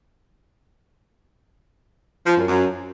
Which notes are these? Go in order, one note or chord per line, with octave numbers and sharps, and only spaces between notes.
F3
F#2
F#2